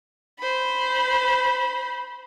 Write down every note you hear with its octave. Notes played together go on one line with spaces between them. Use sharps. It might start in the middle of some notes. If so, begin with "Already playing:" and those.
C5 B5